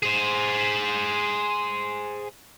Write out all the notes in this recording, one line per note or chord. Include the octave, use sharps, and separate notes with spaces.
G#4 C5